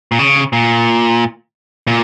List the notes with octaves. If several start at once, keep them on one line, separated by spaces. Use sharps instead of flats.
A#2
C#3
A#2
A#2